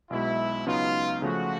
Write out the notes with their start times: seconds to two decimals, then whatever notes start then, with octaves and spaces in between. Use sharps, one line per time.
0.10 B1 B2 G#3 E4
0.66 C#2 C#3 F#3 B3 D#4 F4
1.22 C#3 F3 A3 F#4